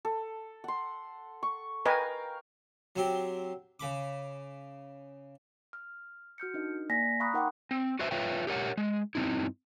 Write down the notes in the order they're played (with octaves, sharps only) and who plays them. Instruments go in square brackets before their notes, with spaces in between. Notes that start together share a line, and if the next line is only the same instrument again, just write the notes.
[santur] A4
F#5 C6
C#6
[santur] A#4 F5 G5 [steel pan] B4 D#5 G#5
[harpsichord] F#3 C4 G4
C#3 B5 D6
[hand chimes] F6
F#4 F6 G6 C#7
D4 D#4 A#4 D#5
A#3 D5 G#5 A#6 B6
F5 A#5 B5 C#6 D#6 F#6
D#4 A#4 F#5 G5 C6 D6
[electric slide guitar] C4
F#4 B4 C5 E5
F4 B4 C#5 E5 F5 G5
G4 A#4 C#5 F#5
G#3
G2 E3 C4 D#4 E4